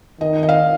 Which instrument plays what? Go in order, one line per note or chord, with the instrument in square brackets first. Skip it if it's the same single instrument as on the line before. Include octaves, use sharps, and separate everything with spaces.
[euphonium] D#3 [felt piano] D#5
[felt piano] D#5
F5